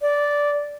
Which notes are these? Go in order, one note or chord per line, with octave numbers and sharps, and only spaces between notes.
D5